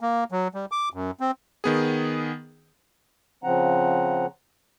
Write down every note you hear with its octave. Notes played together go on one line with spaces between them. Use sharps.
A#3
F#3
G3
D6
F#2
C4
D#3 B3 G#4
C#3 F3 C4 F#5 A#5